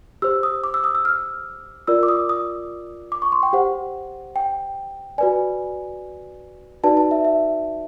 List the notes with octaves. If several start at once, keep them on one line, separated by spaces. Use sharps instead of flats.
G4 C5 E6
D#6
D6
E6
D#6
E6
F6
F4 A#4 D5 E6
D6
D#6
D#6
D6
C#6
C6
G5
G4 C5 F#5
G5
F#4 B4 D5 G#5
D#4 F#4 B4 D5 A5
A5
E5
E5